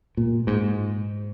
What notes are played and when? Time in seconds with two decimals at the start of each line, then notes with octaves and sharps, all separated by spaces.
0.17 A#2
0.47 G#2